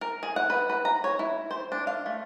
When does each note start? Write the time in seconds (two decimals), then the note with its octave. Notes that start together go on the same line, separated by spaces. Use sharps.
0.01 A#4
0.23 G#4
0.36 F#5
0.50 B4
0.70 B4
0.85 A#5
1.04 C#5
1.19 E4
1.51 C5
1.72 D4
1.87 F5
2.06 A3